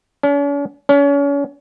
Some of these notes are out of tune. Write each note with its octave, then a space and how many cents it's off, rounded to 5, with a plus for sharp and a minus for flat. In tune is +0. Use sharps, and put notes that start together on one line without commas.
C#4 +45
C#4 +35